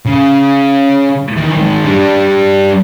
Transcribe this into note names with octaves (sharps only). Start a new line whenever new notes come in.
C#3
D#3 E3
D#3 G#3
G3 D4